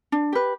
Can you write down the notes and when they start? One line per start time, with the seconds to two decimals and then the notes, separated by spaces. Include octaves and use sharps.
0.12 D4
0.33 G4 B4